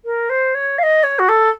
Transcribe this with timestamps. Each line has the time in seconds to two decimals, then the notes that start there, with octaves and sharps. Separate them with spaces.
0.05 A#4
0.29 C5
0.54 C#5
0.78 F5
0.83 D#5
1.03 C#5
1.19 F#4
1.28 A4